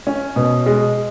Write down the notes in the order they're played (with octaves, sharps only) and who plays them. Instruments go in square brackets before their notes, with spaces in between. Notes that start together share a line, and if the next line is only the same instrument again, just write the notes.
[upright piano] C#4
B2
G#3